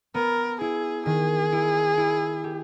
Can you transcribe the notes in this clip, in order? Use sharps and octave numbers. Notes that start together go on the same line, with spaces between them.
B3 A#4
E4 G#4
D#3 G#4
E4
E4
G4